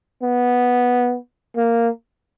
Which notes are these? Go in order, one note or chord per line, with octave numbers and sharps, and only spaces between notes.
B3
A#3